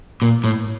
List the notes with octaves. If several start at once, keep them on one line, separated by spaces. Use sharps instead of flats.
A#2
A2